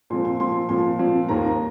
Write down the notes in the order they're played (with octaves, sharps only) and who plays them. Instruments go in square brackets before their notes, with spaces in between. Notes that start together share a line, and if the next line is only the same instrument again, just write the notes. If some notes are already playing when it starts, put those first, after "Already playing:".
[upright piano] A#2 F3 C4 C6
C6
A#2 F3 C4 C6
A#2 F3 C4 C6
A#2 F3 C4
D#2 D#3 A#3 A#5